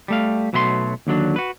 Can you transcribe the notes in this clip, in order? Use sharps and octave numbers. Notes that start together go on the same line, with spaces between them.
G3 A3 F5
B1 B2 F#3 A3 A#5 C6
D#2 D3 F#3 D4
F#4 B4